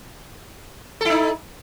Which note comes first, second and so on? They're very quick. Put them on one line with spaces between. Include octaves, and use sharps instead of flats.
A4 E4 D#4